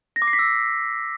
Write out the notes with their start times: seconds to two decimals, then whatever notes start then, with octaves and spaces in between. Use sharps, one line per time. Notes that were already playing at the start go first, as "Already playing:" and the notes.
0.16 A#6
0.22 D6
0.28 C7
0.33 B6
0.39 E6